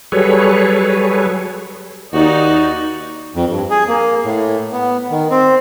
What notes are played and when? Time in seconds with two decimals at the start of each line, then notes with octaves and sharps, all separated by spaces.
0.12 F#3 G3 G#4 A4 B4 C#5
2.13 D#2 D#4 F#4 D5
3.35 F2
3.50 G2
3.70 G#4
3.88 A#3
4.25 A2
4.72 B3
5.10 D#3
5.31 C4